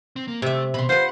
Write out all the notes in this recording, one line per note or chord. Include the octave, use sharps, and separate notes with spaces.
C4
A#3
C3 A3 E5
B2 B5 C6
F4 B4 C5 F#5